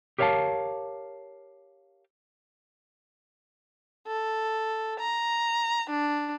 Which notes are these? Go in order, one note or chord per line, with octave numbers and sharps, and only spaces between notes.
G4 A#4 C#5 E5 F5 A5
A4
A#5
D4